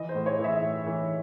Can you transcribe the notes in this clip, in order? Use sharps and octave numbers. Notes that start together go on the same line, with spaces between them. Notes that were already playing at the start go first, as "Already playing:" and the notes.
Already playing: E3 D#5
C5
A2
C#5
E3
E5
A2
E3